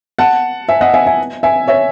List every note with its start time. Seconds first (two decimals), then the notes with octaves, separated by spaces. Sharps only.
0.19 F#5 A5
0.69 E5 G#5
0.81 D#5 F#5
0.94 E5 G#5
1.06 E5 G#5
1.43 E5 G#5
1.68 C#5 E5